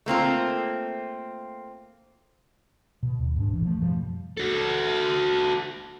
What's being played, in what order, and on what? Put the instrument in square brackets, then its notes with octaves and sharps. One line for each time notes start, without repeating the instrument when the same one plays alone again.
[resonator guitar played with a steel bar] A3 A#3 C4 F4
[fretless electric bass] B2
D#2
G#2 D4
A1 E3
F3 A3
F#2 B2 F3 G3
[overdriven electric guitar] F#4 A4